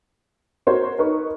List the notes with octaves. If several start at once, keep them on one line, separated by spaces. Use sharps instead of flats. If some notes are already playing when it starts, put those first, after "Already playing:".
F#4 A#4 C5 C#5
D#4 A#4 B4 C#6